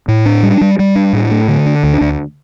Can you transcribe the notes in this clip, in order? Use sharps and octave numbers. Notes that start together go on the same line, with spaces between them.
A2
D4
G3
G3
G3
D4
A2
A3
D3
D4
D2
D2